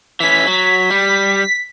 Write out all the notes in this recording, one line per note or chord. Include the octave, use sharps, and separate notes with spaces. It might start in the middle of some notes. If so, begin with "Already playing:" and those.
E3 C#4 B6
F#3
G3